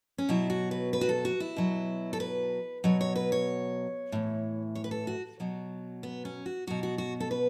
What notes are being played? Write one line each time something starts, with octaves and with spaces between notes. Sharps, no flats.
C#4
B2 F#3 E4
F#4
B4
B4
F#4
A4
F#4
E4
B2 F#3
A4
B4
B2 F#3 C#5
C#5
B4
C#5
A2 E3
C#5
B4
A4
F#4
B2 F#3
B3
C#4
F#4
B2 F#3 F#4
F#4
F#4
A4
B4